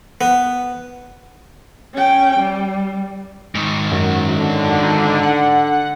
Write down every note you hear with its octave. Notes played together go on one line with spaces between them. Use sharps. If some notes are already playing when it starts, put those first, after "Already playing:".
B3
C#4 G5
G3
G#2 D#3
F#2
D3
D#4
F#5